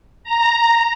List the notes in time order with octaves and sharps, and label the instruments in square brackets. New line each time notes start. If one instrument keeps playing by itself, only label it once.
[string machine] A#5